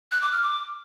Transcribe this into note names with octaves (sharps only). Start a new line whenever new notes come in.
F#6
D6
F6
D6